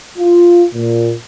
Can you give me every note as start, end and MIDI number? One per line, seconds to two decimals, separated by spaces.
0.18 0.64 65
0.74 1.13 46